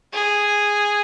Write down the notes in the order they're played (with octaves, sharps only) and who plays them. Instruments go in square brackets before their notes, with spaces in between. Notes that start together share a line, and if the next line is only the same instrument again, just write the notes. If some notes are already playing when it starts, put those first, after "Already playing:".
[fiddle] G#4